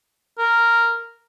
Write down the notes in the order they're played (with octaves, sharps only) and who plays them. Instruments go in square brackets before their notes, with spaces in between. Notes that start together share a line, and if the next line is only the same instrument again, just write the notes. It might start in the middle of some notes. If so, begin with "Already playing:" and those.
[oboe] A#4